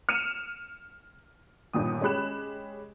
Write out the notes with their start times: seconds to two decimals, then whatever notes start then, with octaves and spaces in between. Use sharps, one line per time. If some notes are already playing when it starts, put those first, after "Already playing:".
0.09 F6 C#7 D#7 E7
1.73 G1 G2 A#2 D#3 D#6
2.01 G#3 C#4 G4 B5 F#6 E7